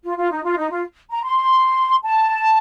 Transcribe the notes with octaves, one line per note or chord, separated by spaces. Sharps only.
F4
F4
D#4
F4
D#4
F4
A#5
C6
A5